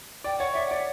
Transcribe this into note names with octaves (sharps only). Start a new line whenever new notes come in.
D5 G5
C#5 F#5
D5 E5
F#5
D5